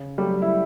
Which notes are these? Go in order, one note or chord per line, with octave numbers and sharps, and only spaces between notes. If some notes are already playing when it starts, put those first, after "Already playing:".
Already playing: C#3
F#3 G3 A3 G4
E4